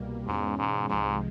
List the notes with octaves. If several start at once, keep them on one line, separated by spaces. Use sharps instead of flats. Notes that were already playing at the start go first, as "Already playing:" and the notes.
Already playing: C2 B2 G3 A#3
E2 G#2 B2 G#3 C#4
G#2
C2 G#2 C3 F3 G#3